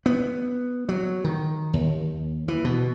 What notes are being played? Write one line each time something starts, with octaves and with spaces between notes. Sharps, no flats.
B3
F#3
D#3
D#2
E3
B2